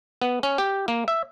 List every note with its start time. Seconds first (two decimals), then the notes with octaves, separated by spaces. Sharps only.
0.22 B3
0.43 C#4
0.58 G4
0.88 A#3
1.08 E5